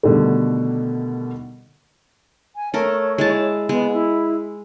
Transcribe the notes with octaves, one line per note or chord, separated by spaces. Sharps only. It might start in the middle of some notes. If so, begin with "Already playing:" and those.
B2 D3 D#3 G3 A3
G#5
A3 A#4 C#5
G#3 E4 A5
G#3 B3
E4